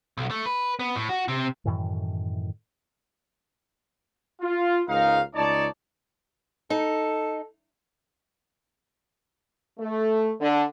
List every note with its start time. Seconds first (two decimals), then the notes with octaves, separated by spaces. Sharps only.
0.18 B1
0.31 A3
0.46 B4
0.79 B3
0.96 A2
1.09 F#4
1.28 C3
1.65 F#2 A2 D#3 E3
4.42 F4
4.89 C#2 G#2 D#4 A#4 F5
5.35 C#2 D#4 C#5 D5 A5
6.70 D#4 A4
9.78 A3
10.40 D3